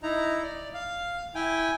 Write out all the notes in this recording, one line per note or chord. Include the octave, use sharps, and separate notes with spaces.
D#4 E4 A#5
D5
F5
E4 G5 G#5